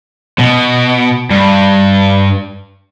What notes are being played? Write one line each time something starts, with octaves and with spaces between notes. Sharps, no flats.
B2
G2